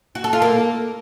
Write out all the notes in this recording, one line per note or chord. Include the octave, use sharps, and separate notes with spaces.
F#4
A4
F4
A#3